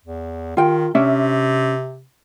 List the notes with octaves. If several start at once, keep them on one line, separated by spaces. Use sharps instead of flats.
E2
D#3 F4 G5
C3 C#4 D4 E5